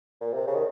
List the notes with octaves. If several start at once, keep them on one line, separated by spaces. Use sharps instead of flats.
A#2
C3
C#3
D#3